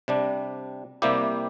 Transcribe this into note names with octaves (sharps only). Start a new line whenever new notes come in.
C3 G3 D4
C3 G3 A#3 E4 G4